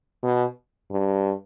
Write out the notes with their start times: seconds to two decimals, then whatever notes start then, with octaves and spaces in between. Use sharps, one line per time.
0.23 B2
0.91 G2